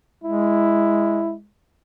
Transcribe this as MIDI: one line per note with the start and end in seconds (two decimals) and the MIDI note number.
0.24 1.47 56
0.24 1.33 64